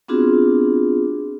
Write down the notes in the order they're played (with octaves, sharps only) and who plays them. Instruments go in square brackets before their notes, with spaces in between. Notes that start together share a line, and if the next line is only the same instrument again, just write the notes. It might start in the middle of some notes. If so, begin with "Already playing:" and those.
[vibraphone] B3 C4 D4 F4 F#4 G#4